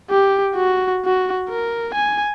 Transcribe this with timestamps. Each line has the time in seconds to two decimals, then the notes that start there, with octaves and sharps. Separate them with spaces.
0.10 G4
0.55 F#4
1.05 F#4
1.49 A#4
1.94 G#5